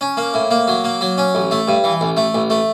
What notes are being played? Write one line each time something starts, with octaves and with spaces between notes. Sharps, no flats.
C#4
A#3
A2
A#3
F#3
A#3
F#3
C#4
A1
A3
G2
E3
A1
A3
A1
A3